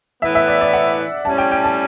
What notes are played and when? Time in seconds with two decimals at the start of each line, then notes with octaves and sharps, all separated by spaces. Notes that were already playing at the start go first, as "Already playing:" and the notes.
0.22 A2 E3 B3 E5
0.35 E5
0.48 D5
0.61 D5
0.73 F#5
1.25 A2 G3 C#4 A5
1.38 G5
1.51 G5
1.64 A5